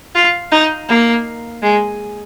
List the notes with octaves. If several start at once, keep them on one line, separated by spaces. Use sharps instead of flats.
F4
D#4
A#3
G#3